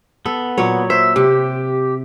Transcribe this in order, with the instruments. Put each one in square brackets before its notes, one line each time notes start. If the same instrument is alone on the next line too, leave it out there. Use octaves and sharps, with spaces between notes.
[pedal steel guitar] B3 [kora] A4
[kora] A#2 F#3 C#5
[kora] C5 [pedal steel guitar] E5
[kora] C3 [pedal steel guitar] G4